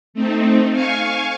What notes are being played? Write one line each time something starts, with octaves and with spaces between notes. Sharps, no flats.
A3 C4 D#4
F5 G#5 C#6